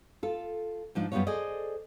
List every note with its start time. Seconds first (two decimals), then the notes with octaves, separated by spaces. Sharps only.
0.23 F4 A4
0.95 G#2 F3 D4
1.12 F#2 G3 B3 D4 F4 C#5
1.27 G#4 A4 C5 D5 D#5